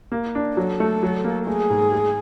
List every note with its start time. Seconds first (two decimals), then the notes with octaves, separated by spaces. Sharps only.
0.12 A#3
0.35 D4
0.57 F#3 A4
0.80 A3
1.03 F#3
1.24 A#3
1.47 A3 G#4
1.70 G#2
1.92 G#3